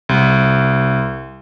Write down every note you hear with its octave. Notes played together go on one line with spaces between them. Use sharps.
C2